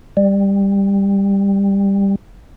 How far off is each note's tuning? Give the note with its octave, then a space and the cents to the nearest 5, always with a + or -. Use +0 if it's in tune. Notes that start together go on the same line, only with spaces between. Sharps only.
G3 +15